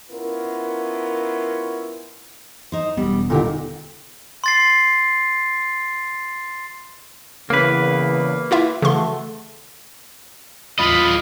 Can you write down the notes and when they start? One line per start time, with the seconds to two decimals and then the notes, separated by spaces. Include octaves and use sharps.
0.11 B3 C#4 E4 F4 A#4
2.72 D#4 C5
2.97 E1 G3 B3
3.30 A#2 D3 D#3 G4 A#4
4.44 C6 A6 C7
7.50 E2 C#3 A#3 B4
8.51 E4 F4 E5
8.82 C#3 E3 A3 F#4 A4 C6
10.79 F4 D#5 B5